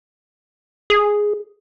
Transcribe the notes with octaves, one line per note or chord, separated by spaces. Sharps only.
G#4